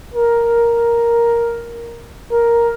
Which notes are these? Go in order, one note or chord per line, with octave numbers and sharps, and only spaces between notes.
A#4
A#4